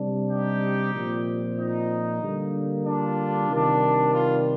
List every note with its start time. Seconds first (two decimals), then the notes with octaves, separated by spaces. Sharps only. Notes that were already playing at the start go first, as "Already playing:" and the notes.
Already playing: C3 G3 D4
0.30 D#4 G4
0.94 A#2 F3 C4
1.58 D#4
2.22 D3 G3 A#3
2.86 D4 F4
3.49 C3 D#3 G3 D4
4.14 D4 F4